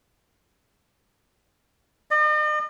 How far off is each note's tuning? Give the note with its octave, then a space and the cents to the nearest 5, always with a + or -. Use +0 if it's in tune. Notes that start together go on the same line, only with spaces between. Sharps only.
D#5 -45